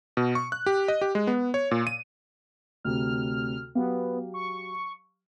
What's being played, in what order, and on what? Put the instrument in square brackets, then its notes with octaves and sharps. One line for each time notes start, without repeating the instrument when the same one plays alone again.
[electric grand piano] B2
C#6
F#6
G4
D#5
G4
G#3
B3
C#5
A#2
D#7
[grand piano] D2 C3 [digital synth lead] F6
[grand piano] F#3 G4 F5 [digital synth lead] B3
[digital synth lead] C#6